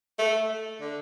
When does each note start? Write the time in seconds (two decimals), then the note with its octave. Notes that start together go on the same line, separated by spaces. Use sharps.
0.19 A3
0.81 D3